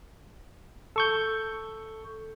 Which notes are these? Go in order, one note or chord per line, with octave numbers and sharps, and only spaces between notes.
A4 C#6 G6